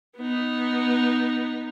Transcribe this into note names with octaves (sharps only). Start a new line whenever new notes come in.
B3 D#4